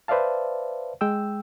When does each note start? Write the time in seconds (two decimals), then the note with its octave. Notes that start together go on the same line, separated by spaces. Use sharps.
0.08 B4 C5 D5 E5 F5 A5
1.01 G#3 G5 E6